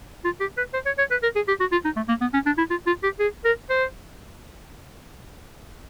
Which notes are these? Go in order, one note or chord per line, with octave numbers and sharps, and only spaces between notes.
F4
G4
B4
C5
C#5
C#5
B4
A#4
G#4
G4
F#4
F4
D#4
A3
A#3
B3
C#4
D4
E4
F4
F4
G4
G#4
A#4
C5